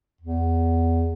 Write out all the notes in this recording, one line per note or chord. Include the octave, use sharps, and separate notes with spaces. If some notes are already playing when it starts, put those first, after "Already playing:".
E2